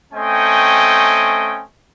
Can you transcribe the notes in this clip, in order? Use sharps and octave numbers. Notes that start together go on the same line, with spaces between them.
A3 C4 C#4 D#5 G5 G#5